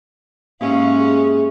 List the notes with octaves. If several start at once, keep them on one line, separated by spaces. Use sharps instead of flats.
G#2 A#3 C#4 G4 E5 F5
G#4